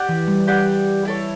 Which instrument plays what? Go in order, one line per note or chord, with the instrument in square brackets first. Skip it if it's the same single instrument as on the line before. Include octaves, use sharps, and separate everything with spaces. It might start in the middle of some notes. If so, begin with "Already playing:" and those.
Already playing: [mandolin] G4 D5 F#5
[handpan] E3
G3
[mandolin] G4 D5 F#5
E4 A4 C#5